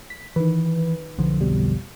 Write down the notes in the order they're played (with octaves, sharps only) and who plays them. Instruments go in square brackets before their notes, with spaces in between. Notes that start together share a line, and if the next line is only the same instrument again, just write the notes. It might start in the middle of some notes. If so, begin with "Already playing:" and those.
[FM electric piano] B6
[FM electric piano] D#3 B4 [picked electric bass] E3
[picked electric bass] B1 D3 F3
[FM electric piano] F2 B2 G3